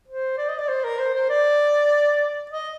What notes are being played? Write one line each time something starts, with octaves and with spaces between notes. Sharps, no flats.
C5
D5
D#5
D5
C5
A#4
C5
C5
D5
D#5